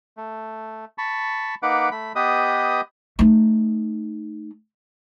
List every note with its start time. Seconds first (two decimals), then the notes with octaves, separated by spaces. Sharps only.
0.17 A3
0.98 A5 B5 C#6
1.63 A#3 D#4 B4 F#5 D6
1.91 A3 B5
2.15 B3 G4 B4 D#5 D#6
3.19 A3 D#4